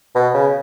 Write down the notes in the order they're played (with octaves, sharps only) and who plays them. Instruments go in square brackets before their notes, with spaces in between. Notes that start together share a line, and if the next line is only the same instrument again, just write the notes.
[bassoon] B2
C#3